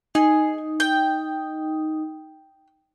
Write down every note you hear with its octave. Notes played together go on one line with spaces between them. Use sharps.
D#4 G#4
G5